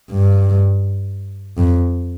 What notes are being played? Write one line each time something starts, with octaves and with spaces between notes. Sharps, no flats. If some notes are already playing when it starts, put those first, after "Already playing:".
G2
F2